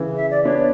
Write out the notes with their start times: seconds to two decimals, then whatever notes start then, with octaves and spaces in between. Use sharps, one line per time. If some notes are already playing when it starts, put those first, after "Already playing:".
Already playing: C#3 E3
0.16 E5
0.31 D5
0.45 B3 D4 C#5